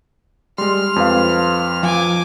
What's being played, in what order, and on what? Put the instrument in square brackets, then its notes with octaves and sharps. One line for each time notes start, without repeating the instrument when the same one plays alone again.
[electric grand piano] G3 G#3 [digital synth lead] C6 [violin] F6
[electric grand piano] F2 B4 F5
[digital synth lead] F3 [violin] G#5 D6